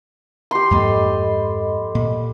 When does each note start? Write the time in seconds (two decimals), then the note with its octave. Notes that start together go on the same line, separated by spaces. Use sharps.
0.51 G4 C6
0.71 F2 G#2 A#3 A4 D#5 B5
1.95 A#2